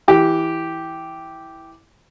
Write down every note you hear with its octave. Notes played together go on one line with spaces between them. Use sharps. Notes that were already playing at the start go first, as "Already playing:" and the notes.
E3 G4